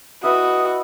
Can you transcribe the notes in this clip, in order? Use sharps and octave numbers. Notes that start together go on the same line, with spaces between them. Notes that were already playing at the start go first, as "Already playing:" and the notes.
E4 F#4 B4 D#5 D#6